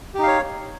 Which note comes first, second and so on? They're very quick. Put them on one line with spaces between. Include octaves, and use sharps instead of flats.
G4 D#4 F5 C#5